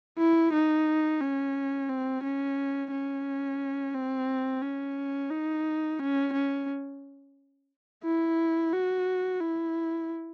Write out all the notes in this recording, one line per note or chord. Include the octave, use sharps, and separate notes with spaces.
E4
D#4
C#4
C4
C#4
C#4
C4
C#4
D#4
C#4
C#4
E4
F#4
E4